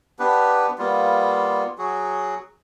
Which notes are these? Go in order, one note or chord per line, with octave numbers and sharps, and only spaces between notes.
B3 D4 G4 B4
G3 A#3 B3 F4
F#3 F#4 G#4